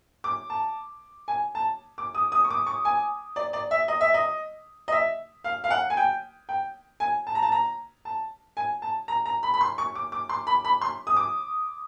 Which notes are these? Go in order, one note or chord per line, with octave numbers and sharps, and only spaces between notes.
D6
A5
G#5
A5
D6
D#6
D#6
C#6
D6
C#6
G#5
D5
D5
E5
D#5
E5
D#5
D#5
E5
F5
F5
F#5
G#5
G5
G5
G#5
A5
A#5
A5
A#5
A5
G#5
A5
A#5
A#5
B5
B5
C6
C#6
D6
D6
C6
B5
B5
C6
D#6
D6